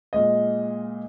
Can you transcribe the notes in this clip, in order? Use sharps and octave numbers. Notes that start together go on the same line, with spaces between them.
A#2 G#3 D#5